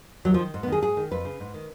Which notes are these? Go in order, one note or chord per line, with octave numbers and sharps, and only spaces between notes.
D#2 F#3
F3
D#3
G#2
B3
D#3 G#4
G#2 G#4
D#3
F2 B4
C#3
G#2
D#3